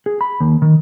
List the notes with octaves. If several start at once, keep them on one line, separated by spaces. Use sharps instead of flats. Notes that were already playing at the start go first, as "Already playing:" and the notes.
G#4
B5
D#2
D#3